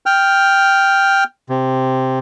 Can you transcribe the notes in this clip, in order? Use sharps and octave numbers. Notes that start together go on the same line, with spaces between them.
G5 F6
C3